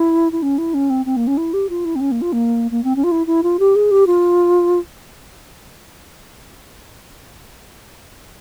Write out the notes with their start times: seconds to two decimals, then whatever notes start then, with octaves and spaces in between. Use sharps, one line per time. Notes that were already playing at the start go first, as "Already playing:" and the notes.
Already playing: E4
0.32 E4
0.42 C#4
0.58 E4
0.74 C#4
0.90 C4
1.06 C4
1.16 A#3
1.27 C#4
1.37 E4
1.53 G4
1.69 F4
1.85 E4
1.96 C4
2.01 C#4
2.11 A#3
2.22 F4
2.33 A#3
2.71 A#3
2.84 C4
2.96 C#4
3.04 F4
3.11 E4
3.27 E4
3.43 F4
3.59 G4
3.76 G#4
3.91 G4
4.07 F4